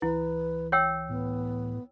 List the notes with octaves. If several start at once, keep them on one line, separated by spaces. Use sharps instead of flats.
C#2 E3 E4 B4
C#5 G5 E6
A2 B3